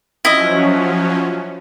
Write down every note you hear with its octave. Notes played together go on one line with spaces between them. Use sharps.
F3 F#3 C#4 E4 D#5